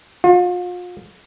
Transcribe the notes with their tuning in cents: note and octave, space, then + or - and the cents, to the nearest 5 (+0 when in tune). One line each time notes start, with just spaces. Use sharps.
F4 +40